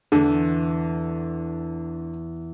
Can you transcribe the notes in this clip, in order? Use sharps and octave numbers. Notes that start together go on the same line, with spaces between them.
E2 D3